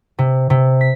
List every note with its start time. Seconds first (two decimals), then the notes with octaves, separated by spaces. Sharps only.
0.19 C3
0.50 C3
0.81 B6